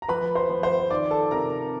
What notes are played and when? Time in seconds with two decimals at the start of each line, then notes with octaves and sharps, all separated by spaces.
0.02 A#5
0.08 F3 B4 B5
0.35 C5 C6
0.49 F3
0.63 C5 C6
0.90 D#3 D5 D6
1.11 A4 A5
1.31 C3 A#4 A#5